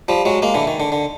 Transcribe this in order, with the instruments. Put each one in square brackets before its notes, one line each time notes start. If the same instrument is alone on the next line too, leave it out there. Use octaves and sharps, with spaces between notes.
[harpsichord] F3 G3
F#3 G#3
G#3 A#3
D3 E3
D#3
D3
D3